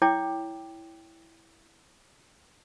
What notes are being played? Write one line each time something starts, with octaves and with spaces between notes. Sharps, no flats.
E4 C#5 G5 D6